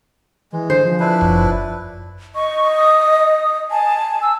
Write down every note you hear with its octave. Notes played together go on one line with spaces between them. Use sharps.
E3 G#3
D3 C5
F3
D4 E4 B4
F#1 F#2
D#5 C#6
D#6
G#5 A5
E6